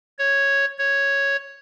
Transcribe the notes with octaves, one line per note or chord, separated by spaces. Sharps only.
C#5
C#5